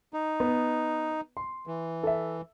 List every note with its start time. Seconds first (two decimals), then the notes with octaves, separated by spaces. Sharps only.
0.13 D#4
0.40 B3
1.37 C6
1.67 E3
2.03 A4 E5